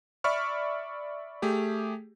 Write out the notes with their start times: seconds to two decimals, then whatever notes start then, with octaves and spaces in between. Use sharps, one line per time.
0.24 D5 E5 B5 C#6 F6
1.42 A3 G4 G#4